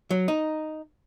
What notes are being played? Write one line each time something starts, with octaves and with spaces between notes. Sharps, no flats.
F#3
D#4